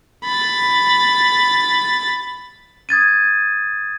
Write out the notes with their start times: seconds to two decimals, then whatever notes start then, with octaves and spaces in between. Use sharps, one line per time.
0.24 B5 A6
2.89 D#6 G#6 A6 D#7